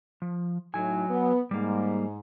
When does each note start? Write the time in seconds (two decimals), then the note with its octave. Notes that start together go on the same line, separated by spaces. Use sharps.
0.22 F3
0.74 A2 F#3 D#4 G#5
1.09 B3
1.51 G#2 G3 A#3